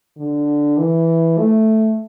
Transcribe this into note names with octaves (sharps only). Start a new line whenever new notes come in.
D3
E3
A3